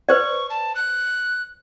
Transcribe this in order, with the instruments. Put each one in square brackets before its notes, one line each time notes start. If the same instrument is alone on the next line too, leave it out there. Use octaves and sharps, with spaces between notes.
[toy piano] B4 C5 D5 [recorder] C#6
[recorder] A5
F#6